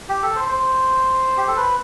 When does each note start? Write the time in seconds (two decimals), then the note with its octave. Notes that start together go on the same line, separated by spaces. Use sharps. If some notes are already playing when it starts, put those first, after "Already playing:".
0.09 G4
0.23 A4
0.36 C5
0.49 C5
1.37 G4
1.47 A4
1.57 B4